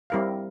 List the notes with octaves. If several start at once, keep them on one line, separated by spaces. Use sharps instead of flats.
G3 C4 E4 A#4 F5